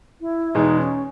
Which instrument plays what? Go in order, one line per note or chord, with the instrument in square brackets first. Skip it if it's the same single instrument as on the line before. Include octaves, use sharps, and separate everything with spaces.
[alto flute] E4
[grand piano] E2 B2 G#3 [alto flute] D#4
[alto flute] C#4